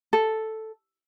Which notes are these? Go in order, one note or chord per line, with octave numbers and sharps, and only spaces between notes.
A4